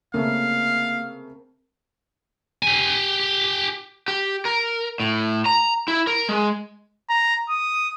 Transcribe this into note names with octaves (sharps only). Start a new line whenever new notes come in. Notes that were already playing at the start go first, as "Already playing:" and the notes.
C#3 A3 A#3 C4 A#4 F5
G4 G#5
G4
A#4
A2
A#5
E4
A#4
G#3
A#5
D#6